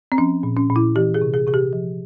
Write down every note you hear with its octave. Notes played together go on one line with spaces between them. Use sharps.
C4
F3 C#4
A#2
C#4
A#2
E4
E3 G4
G#4
C3
G#4
C3 G#4
G4
F3